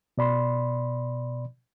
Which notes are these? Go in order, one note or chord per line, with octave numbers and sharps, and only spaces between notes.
B2 D5 B5 C6